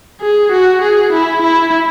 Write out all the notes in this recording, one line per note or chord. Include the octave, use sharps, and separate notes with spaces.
G#4
F#4
G#4
E4
E4